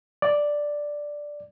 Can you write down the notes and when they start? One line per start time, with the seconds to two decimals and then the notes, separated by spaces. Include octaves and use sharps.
0.22 D5